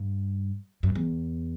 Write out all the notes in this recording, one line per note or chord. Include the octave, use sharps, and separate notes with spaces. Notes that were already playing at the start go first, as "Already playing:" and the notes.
Already playing: G2
F#2
E2